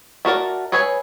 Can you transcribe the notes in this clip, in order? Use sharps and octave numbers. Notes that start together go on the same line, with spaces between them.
A3 F#4 A#4 D5
G#4 B4 C#5 E5 G#5